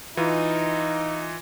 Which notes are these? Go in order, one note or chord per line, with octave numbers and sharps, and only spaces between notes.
E3 D#4 F4